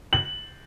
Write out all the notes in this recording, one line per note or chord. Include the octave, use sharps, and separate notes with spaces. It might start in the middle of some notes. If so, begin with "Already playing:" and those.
F#7